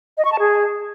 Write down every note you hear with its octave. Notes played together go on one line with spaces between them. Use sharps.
D#5
C#6
A5
G#4